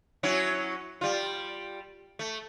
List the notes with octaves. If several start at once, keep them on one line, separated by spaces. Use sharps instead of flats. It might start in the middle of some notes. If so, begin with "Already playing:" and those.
F#3 C#4 E4
G3 F4
A3